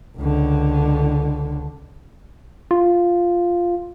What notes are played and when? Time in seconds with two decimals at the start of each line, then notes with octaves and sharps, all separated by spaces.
0.17 C#2 D3
2.71 F4